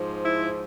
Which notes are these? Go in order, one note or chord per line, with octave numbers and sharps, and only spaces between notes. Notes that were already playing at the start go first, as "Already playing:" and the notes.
Already playing: G#2 F3
E4